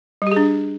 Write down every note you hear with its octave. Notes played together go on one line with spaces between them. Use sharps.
G3 D4 G4 G#4